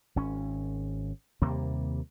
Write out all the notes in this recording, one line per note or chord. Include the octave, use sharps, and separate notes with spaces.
G#1 C#4
D#2 C3 G3 A#3